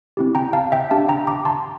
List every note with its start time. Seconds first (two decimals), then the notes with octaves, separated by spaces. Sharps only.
0.17 C4 E4 G4
0.35 G5 A#5
0.53 F5 A5
0.72 E5 G5
0.91 D4 G4 F5 A5
1.09 G5 A#5
1.27 A#5 D6
1.45 A5 C6